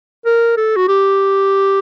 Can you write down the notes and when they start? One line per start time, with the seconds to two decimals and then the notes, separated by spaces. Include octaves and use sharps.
0.26 A#4
0.57 A4
0.76 F#4
0.88 G4